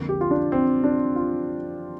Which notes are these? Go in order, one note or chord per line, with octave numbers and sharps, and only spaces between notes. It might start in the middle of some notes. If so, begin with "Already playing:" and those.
Already playing: F2 D3 A#3
G4
F4
D4
C4
D4
F4